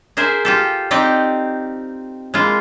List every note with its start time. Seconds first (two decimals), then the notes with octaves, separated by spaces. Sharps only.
0.17 G#4 A#4 C5 E5 G#5
0.45 F4 G4 A4
0.91 C4 D#4 G4 D5 D#5
2.34 G#3 A#3 E4 F4